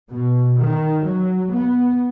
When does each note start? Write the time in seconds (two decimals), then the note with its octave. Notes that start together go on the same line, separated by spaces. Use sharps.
0.11 B2
0.58 D#3
1.05 F#3
1.52 B3